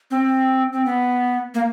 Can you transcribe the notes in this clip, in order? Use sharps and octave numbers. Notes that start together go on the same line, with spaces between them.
C4
C4
B3
A#3